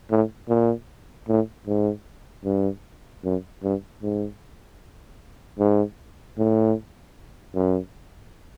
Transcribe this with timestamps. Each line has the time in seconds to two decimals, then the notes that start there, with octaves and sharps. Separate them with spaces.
0.11 A2
0.49 A#2
1.28 A2
1.67 G#2
2.45 G2
3.24 F#2
3.63 G2
4.02 G#2
5.59 G#2
6.38 A2
7.55 F#2